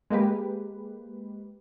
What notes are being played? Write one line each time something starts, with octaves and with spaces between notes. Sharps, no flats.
G#3 A#3 G4 B4